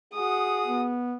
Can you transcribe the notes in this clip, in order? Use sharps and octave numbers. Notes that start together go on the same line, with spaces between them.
F#4 G#4 D#6
B3